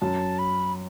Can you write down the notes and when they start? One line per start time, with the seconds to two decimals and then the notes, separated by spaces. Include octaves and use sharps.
0.01 F#2 A5
0.38 B5